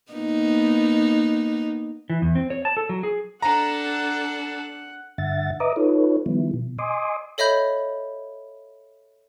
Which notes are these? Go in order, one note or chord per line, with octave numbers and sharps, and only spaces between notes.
A#3 B3 D#4
E3
E2
C4
C#5
A5
A4
F#3
G#4
D4 A4 F#5 A#5
G2 D3 E5 F#5 A6
B4 D#5 E5 A#5 D6 D#6
D#4 F4 A4 B4 C#5
D#3 F3 G3 B3 E4
B2
D#5 G#5 C6 D6 D#6
A4 C#5 D#5 E5 B5 G6